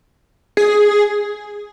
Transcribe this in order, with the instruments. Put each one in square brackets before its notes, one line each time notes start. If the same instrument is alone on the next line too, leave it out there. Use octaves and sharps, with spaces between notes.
[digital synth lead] G#4